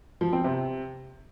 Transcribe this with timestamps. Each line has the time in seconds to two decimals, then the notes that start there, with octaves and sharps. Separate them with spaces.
0.21 F3
0.33 C4
0.44 C3